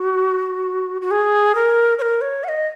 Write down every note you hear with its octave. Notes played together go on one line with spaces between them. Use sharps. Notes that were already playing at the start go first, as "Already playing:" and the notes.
Already playing: F#4
F#4
G#4
A#4
C#5
A#4
C#5
F#5
D#5